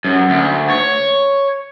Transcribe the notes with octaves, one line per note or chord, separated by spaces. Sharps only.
F#2
D2
C#5